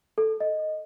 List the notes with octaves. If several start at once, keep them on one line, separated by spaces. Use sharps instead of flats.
A4
D#5